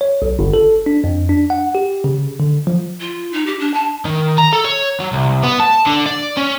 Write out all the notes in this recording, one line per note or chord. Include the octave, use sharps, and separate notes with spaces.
C#5
B1
G1
A4
D4
F2
D4
F#5
G4
C#3
D3
F3
F4
D#4
G4
D4
A5
D#3
A#5
A4
C#5
F#3
C2
B3
A5
D3
D5
C#4